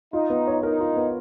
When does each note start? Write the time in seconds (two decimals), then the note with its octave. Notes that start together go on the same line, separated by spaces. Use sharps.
0.13 D#4 F4
0.30 B3
0.47 C#5
0.63 D#4 A#4
0.80 F4
0.96 B3